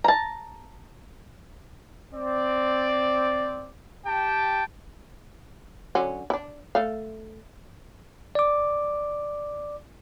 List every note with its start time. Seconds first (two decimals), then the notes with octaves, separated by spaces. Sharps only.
0.04 A5 A#5
2.14 C4 D5
4.07 G4 G5 A5
5.95 D3 F#3 C#4
6.30 D4 E4
6.75 A3 F5
8.35 D5 D6